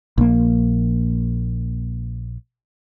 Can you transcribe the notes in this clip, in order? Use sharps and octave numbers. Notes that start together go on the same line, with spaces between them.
A#1 A#3